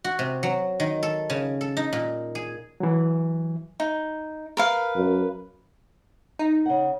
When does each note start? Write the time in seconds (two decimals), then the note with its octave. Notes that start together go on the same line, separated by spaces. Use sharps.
0.04 F#4
0.19 C3
0.43 F#3
0.80 D#3
1.03 A4
1.30 C#3
1.61 A4
1.77 D#4
1.93 A#2
2.35 G#4
2.80 E3 F#3
3.80 D#4
4.57 A#4 B4 F5
4.96 F#2
6.39 D#4
6.66 C#3 F#5